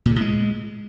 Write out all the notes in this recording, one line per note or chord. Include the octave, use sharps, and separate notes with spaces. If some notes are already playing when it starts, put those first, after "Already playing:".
A#2
C#3
A2
G#3